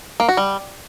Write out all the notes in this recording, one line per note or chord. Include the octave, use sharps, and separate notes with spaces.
A#3
F#4
G3